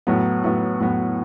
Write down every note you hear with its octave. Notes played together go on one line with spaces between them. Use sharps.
A2 F#3 B3
A2 F#3 B3
A2 F#3 B3